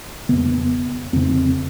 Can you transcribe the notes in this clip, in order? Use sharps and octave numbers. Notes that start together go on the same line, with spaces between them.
F2 C#3 B3
F2 C#3 C4